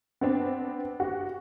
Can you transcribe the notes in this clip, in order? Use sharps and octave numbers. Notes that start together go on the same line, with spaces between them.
B3 C4 D4
F#4 G4